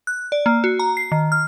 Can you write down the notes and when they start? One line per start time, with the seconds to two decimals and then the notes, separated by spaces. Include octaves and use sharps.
0.07 F#6
0.32 D5
0.46 A#3
0.64 F#4
0.79 A#5
0.97 C7
1.12 D#3
1.32 F6